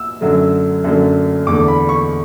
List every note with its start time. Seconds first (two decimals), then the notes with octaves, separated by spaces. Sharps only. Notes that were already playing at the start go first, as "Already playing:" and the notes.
Already playing: E6
0.21 F#2 D3 F#3 A3
0.84 F#2 D3 F#3 A3
1.47 E2 D3 A3 D6
1.68 B5
1.89 C#6